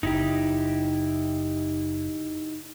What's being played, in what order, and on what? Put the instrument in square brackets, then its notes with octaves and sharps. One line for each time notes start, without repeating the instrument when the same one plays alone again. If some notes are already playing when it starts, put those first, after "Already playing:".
[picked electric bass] F#1 [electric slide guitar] D#4 E4 G4